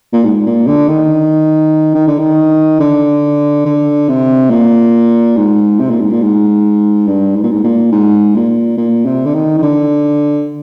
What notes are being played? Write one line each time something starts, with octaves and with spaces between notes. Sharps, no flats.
A#2
G#2
A#2
D3
D#3
D#3
D3
D#3
D3
D3
C3
A#2
G#2
C3
A#2
G#2
A#2
G#2
G2
G#2
A#2
G#2
A#2
G#2
A#2
A#2
C3
D3
D#3
D#3
D3